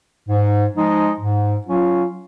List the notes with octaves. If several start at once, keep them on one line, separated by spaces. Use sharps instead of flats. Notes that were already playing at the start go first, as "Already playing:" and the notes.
G#2
F3 G#3 D#4
G#2
F#3 C#4 F4